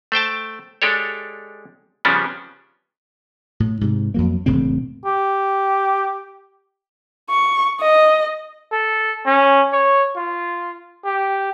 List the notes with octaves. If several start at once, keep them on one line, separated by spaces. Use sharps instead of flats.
A3 C5 G5 A5
G#3 D4 G4 A4 C#5
C#3 F3 G3 B3 C#4 D4
A2
G#2 C3
F2 F#3 A#3
E1 A2 C#3 C4
G4
C#6
D#5
A4
C#4
C#5
F4
G4